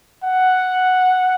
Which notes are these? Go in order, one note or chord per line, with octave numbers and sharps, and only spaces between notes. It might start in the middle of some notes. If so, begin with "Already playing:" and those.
F#5